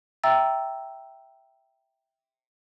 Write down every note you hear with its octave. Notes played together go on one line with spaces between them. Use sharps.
E5 G5 A#5 E6 A6